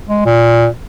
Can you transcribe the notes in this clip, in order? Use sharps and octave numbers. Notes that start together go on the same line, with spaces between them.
G#3
A#2